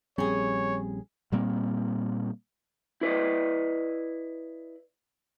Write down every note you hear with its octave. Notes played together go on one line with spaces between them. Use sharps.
A#1 G3 C4 C#4 G#4 C#5
A#2 G3 A#3 C4
E4 B4 D5 D#5